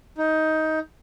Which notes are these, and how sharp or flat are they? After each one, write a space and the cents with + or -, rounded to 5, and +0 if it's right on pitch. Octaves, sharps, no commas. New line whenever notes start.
D#4 +15